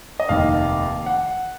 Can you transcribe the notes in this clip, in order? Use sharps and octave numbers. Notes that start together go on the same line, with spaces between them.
D#5
F1 D#2 D#3 F5
F#5